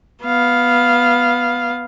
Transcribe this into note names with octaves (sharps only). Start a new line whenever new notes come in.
B3 F5